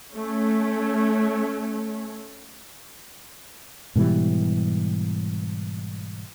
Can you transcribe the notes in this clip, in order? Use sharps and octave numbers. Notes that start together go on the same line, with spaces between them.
A3 C#4
G#2 B2 E3 G3